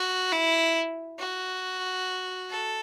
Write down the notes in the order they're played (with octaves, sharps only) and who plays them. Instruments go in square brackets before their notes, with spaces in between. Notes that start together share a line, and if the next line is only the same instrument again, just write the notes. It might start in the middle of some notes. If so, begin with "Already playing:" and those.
Already playing: [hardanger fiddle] F#4
E4
F#4
A4